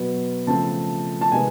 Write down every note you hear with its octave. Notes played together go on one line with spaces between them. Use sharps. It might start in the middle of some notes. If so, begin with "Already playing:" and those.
Already playing: B2 F#3 B3
C#3 F3 A3 C4 A5
A5
C3 D#3 G#3 B3 G#5